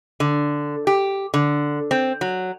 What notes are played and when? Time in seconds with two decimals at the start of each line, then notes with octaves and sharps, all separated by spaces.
0.20 D3
0.87 G4
1.34 D3
1.91 C4
2.21 F#3